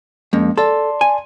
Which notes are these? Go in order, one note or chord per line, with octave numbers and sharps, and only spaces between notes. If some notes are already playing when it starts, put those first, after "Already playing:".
F2 G#3 A#3 C#4
A4 D5 A5 C6
G#5